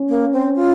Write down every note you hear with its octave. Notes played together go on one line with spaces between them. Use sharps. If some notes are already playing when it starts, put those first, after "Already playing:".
Already playing: C#4
A#3
C4
F4